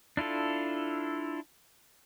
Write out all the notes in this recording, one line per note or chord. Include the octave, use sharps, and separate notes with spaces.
D4 E4 F4 A4